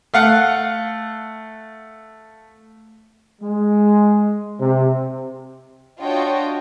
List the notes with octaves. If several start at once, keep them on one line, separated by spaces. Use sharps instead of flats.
A3 F5 F#5
G#3
C3
D4 F4 F#4 C#5 D#5 G5